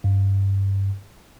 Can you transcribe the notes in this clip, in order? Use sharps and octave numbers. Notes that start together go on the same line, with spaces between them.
G2